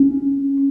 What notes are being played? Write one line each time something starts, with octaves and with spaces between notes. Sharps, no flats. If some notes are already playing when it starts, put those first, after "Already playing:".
Already playing: C#4